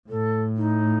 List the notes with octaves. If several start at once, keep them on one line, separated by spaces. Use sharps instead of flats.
A2 A4
D#4